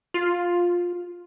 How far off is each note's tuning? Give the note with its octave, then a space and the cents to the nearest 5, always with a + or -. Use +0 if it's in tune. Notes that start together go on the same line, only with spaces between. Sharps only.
F4 +10